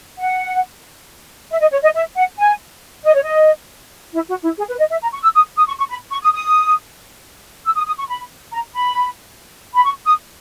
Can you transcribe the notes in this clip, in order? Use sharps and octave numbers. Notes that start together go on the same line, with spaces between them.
F#5
E5
D#5
C#5
D#5
E5
F#5
G#5
D#5
C#5
D#5
E4
F#4
E4
G#4
B4
D#5
E5
A#5
C#6
E6
D#6
D#6
C#6
C#6
B5
C#6
D#6
D#6
E6
D#6
D#6
C#6
B5
A#5
B5
B5
C#6
D#6